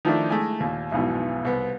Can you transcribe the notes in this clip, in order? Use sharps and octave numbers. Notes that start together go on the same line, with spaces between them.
D#3 F3 A3 D4 E4
G#3 A3 E4 G#5
D#2 A#2
B1 F2 G#2 B2 E3
C2 B3